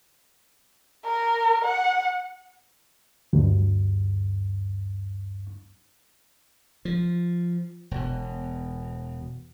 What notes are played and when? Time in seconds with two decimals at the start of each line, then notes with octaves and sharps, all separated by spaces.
1.05 A#4
1.65 F#5
3.33 D2 G2
6.85 F3
7.91 E1 B2